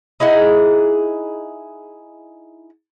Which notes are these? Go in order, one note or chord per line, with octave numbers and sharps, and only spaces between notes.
D#4 E4 G#4 F#5